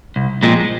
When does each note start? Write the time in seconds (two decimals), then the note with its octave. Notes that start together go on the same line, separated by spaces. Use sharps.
0.16 C2
0.43 A#2 F3 G#3 C4